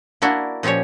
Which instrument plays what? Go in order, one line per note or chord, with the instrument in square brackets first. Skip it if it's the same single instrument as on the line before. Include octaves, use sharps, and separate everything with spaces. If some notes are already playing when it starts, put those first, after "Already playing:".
[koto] A#3 D4 E4 F#4
A#2 F3 C#4 G4 C#5